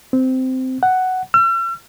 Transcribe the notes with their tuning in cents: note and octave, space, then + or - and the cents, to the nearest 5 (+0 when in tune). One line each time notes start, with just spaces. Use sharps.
C4 -15
F#5 +5
E6 +45